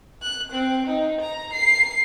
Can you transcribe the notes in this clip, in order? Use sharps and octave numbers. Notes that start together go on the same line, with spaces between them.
F#6
C4
D#4
A#5
C7